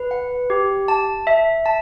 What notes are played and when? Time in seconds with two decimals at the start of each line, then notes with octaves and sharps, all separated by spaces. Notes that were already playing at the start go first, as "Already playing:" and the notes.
Already playing: B4
0.11 F#5
0.50 G4
0.88 A5
1.27 E5
1.66 A5